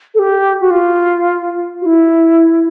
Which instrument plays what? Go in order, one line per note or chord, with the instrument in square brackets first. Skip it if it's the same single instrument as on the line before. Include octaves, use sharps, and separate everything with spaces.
[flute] A4
G4
F#4
F4
F#4
E4